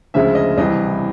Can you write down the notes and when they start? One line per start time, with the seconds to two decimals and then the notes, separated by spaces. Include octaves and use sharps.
0.14 D2 C#3 F3 G#3 E5
0.35 D#5
0.57 C2 C3 E3 D#5